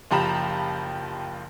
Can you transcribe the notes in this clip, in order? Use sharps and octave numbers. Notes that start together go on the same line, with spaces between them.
F#1 F3 G4 A#5 B5 E7